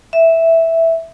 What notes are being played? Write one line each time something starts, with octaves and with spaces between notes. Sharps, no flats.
E5